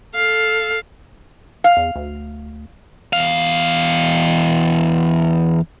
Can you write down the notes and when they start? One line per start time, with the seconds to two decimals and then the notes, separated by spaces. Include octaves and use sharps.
0.15 A4 F5
1.64 F5
1.77 E2
1.96 D2
3.13 E2 F5